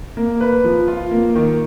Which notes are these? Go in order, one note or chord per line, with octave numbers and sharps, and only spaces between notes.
A#3
B4
F3
F4
A#3
D#3